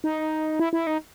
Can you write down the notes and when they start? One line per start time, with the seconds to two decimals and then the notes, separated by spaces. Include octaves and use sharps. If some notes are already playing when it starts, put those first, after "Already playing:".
0.04 D#4
0.59 E4
0.73 E4
0.87 D#4